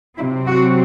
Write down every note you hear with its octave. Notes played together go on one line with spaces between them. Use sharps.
C3 F#3 C4 E4
F#4